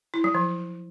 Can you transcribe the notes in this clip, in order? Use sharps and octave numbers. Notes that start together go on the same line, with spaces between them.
E4
F#3
F3